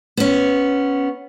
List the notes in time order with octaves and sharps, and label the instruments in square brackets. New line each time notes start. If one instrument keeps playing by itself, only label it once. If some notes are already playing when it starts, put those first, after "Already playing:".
[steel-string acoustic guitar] B3 C#4